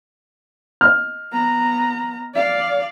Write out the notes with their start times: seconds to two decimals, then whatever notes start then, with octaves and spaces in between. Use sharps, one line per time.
0.81 D#5 F6
1.32 B3 A#5
2.34 D5 F5